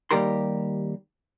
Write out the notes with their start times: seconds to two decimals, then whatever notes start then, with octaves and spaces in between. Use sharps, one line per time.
0.11 D#2 G#2 G3 G4 A#4 C6